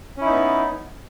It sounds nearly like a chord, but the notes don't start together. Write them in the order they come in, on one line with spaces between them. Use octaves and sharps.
C#4 E4 D#4 B3